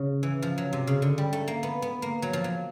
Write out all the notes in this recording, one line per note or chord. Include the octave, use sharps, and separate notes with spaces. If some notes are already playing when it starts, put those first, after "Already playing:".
Already playing: C#3
E3
F3
F#3
C3
C#3
D3
G3
A3
A#3
B3
B3
A#3
F#3
F3
F#3